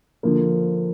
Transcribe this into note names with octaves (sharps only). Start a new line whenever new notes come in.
D3 F3 A#3